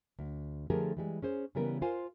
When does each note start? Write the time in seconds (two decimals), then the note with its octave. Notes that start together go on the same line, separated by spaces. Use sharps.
0.19 D2
0.70 D3 F3 A3 G4 G#4 A#4
0.97 E3 G3 G#3
1.22 C#4 G#4 C5
1.55 C#3 E3 G3 B3 A#4
1.82 F4 A#4 C5 F5 G#5